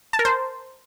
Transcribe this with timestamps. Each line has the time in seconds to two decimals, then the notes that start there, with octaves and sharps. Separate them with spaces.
0.13 A5
0.19 A#4
0.25 C5